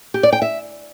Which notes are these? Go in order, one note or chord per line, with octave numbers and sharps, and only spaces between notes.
G4
D5
G5
E5